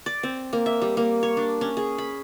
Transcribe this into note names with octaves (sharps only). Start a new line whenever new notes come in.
D5
C4
A#3
E5
G3
A#3
C#5
D4
C#4
G#4
B5